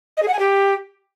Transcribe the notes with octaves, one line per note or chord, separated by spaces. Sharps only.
D#5
G#4
F#5
G#5
G4